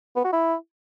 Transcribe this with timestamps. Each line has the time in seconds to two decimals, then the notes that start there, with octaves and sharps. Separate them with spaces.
0.16 B3
0.24 F#4
0.33 E4